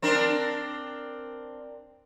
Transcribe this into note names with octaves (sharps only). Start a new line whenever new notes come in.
C4 D4 A#4